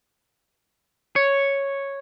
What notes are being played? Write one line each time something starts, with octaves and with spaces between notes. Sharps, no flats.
C#5